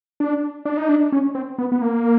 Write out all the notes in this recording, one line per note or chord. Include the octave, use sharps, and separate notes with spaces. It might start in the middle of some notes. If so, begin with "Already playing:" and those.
D4
D4
D#4
D4
C#4
C4
B3
B3
A#3